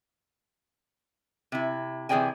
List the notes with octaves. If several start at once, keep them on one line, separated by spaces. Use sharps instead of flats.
C3 E4
C3 E3 G#4 D5 G5 G#5